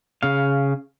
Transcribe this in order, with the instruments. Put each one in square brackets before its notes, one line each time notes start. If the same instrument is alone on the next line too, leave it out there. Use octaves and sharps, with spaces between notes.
[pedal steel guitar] C#3 F5